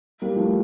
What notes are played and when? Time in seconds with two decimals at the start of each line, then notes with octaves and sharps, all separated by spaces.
0.22 G3 A#3
0.36 F3 A3